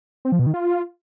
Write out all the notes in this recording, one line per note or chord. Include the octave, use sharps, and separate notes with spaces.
C4
F3
B2
D#3
F4